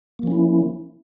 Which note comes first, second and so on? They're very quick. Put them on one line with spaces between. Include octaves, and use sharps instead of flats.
A#3 F3 C#4 E4